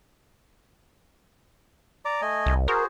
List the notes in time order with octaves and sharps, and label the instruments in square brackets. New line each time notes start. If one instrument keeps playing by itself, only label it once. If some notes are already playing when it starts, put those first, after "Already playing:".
[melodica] D5 A#5 D6
A3 D#5 G#5
[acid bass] C2
[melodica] F#4 G#4 C5 [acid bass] A#4